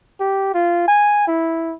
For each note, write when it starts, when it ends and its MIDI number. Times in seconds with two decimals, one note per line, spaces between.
0.20 0.50 67
0.54 0.84 65
0.88 1.25 80
1.28 1.74 64